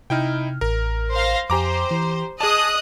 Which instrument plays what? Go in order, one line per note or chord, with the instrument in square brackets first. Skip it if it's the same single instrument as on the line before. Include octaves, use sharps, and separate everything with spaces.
[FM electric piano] C3 F6 [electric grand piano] D#4 E4 G5
[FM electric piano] A1 [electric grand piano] A#4
[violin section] C5 F5 A#6
[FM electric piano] F2 G#5 [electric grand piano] G4 A#5 D6 [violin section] C5
[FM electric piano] E3
[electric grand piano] G#4 A5 [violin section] D#5 D#6 F#6 [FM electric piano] D6